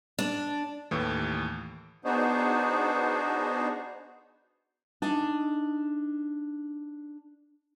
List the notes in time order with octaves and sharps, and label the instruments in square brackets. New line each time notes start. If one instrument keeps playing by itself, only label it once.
[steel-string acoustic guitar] D4
[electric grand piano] D#2 A2 E3
[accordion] B3 D4 D#4 F#4 G#4 C5
[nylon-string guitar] D4 D#4 G#5